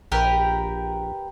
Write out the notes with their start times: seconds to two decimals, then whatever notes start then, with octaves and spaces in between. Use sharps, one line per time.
0.12 A#1 G4 A#4 B4